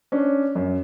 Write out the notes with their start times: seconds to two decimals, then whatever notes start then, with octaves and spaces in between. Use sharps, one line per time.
0.12 C#4 D4
0.55 F#2